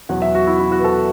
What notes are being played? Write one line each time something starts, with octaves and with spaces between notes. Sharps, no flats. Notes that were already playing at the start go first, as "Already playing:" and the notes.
E2 B2 F#3 F#5
E5
F#4
E4
E4
F#4
B4
A4